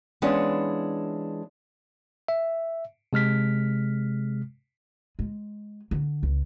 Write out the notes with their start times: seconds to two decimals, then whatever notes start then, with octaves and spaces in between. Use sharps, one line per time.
0.22 E3 G#3 B3 C#4 D4 F4
2.28 E5
3.13 C3 G#3 F6 B6
5.19 G#3
5.91 D3
6.23 C#2